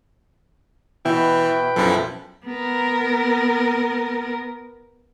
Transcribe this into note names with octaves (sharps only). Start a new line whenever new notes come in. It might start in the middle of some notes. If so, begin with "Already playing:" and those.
B2 E3 E4 B4 G5
B1 F#2 F3 E4 A4
B3 A#4